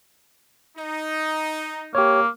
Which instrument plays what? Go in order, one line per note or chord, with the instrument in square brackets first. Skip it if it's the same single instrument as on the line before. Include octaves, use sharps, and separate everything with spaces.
[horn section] D#4
[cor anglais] A#3 [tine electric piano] G4 C#5